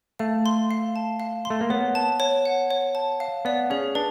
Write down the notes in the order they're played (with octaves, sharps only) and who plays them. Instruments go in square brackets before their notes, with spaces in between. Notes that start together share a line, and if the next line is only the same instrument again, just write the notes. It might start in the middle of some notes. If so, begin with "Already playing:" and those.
[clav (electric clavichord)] A3 [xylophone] F5
[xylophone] C6
F5
A5
F5
C6
[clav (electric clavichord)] A3
A#3
[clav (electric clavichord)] B3 [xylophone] C#5
[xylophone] A5
C#5
F#5
C#5
A5
F5
[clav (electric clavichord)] B3 [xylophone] D5
[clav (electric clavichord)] C#4 [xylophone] G#4
[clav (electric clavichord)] D4 [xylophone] B4